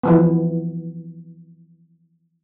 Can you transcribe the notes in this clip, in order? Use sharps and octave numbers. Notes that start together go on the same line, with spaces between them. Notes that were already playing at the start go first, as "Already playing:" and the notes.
E3 F3 B3